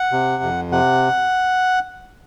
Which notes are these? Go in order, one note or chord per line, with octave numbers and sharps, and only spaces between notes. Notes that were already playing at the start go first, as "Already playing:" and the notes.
Already playing: F#5
C3
F2
C3 F#5